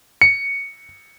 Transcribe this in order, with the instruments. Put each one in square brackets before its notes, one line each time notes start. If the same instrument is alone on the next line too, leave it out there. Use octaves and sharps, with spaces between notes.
[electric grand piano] C#7